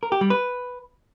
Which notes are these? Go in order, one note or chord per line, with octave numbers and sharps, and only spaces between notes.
A#4
G4
G3
B4